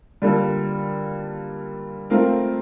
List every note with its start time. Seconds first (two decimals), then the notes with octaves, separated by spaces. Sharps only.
0.22 D3 G3 A#3 F4 A4
2.10 A3 C4 F4 A#4